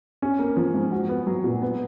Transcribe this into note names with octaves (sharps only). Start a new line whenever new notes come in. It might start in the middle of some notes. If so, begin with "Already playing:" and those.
C#4
A#3
F3
G#2
F#4
B3
F#3
A#2
B3